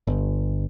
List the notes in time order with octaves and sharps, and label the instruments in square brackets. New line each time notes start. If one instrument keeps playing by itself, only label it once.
[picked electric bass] G1